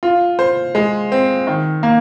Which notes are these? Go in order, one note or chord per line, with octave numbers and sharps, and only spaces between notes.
F4
C5
G#3
C4
D#3
A#3